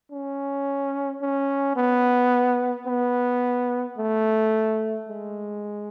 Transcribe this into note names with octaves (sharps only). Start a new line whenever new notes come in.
C#4
C#4
B3
B3
A3
G#3